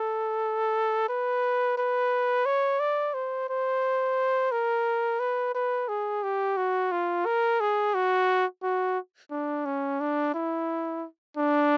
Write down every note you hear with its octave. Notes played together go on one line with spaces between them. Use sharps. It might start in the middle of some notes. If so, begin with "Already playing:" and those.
Already playing: A4
B4
B4
C#5
D5
C5
C5
A#4
B4
B4
G#4
G4
F#4
F4
A#4
G#4
F#4
F#4
D4
C#4
D4
E4
D4